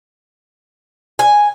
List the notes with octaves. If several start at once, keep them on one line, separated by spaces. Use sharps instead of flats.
G#5